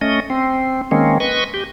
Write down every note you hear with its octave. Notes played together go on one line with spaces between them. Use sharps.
A3 C#4 D#5
C4
D#3 G#3 A#3 C4 C#4
B4 D#5 C#6
G4